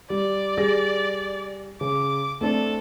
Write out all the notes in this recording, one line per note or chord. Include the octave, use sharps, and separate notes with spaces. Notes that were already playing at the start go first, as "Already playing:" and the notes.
G3 D5
G3 G#4 A#6
C#3 D6
A3 C4 D4 A4